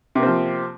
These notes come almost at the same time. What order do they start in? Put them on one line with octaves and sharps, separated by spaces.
C3 A#3 C4 F3